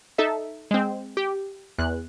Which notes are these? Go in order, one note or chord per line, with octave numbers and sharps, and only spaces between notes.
D#4 A4 E5
G#3 C4
G4
E2 F#6